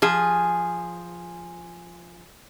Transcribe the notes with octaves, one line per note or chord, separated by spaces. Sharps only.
F3 G#4